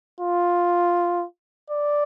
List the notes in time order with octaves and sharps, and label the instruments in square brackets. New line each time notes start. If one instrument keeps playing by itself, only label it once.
[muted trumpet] F4
D5